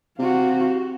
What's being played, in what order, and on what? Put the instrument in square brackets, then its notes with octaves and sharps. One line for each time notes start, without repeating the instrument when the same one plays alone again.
[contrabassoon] C3 [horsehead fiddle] F#4 F5